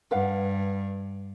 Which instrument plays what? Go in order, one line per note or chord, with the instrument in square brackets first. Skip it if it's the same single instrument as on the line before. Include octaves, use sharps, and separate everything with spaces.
[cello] G2 [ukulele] B4 F5 F#5